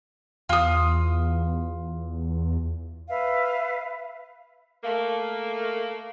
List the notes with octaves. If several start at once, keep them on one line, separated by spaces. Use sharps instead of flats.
E2 F4 D#6
B4 E5 F5
A3 A#3